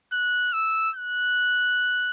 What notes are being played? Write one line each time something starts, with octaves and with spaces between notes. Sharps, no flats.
F#6
E6
F#6